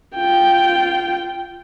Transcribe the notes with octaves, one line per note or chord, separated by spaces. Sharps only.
F4 G5